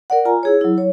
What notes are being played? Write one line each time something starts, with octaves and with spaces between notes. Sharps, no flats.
A#4 D5 F#5
F4 G#5 A#5
E4 G#4 C#5
F#3 E4
C#5